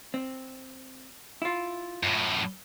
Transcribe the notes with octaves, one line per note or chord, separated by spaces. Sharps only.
C4
E4 F4
F#2 A2